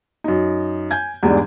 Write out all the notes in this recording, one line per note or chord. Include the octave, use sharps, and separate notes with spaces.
F#2 D#4
G#5 G6 G#6
E2 G#2 E3 G3 D4 D#4